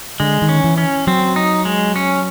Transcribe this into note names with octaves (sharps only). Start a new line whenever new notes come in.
D3 G#3
D#3
C#4
E3
C#4
F#3 C4
D#4
G#3
C#4